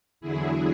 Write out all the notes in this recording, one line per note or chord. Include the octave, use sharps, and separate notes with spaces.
E2 D3 F#3 E4 G#4